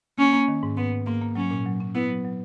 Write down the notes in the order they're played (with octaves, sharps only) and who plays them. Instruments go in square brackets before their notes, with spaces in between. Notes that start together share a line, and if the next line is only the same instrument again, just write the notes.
[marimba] A#3 [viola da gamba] C#4
[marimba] A#3
D#3
G#2
[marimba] G#2 [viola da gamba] B3
[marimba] G#2
[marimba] G#2 [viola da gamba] A#3
[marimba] A#3
[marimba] F#3 [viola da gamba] C#4
[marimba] A#2
F#3
C#4
[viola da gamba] B3 [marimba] E4
[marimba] F#3
F#3